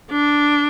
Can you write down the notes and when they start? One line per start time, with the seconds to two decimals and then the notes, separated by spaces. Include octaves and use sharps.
0.11 D4